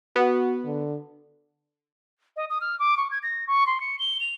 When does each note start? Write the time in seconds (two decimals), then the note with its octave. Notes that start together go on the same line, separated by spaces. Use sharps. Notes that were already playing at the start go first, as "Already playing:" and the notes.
0.16 B3 F#4
0.66 D3
2.36 D#5
2.50 D#6
2.61 F6
2.79 D6
2.97 C#6
3.11 G#6
3.23 A#6
3.47 C#6
3.67 C6
3.80 C#7
3.99 G7
4.20 F7